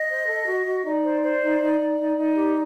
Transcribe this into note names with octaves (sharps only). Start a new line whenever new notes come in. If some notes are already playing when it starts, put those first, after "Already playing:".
Already playing: D#5
C5
A4
F#4
F#4
D#4 D5
C5
C5
D#4
D#4
D#4
D#4
D#4
G4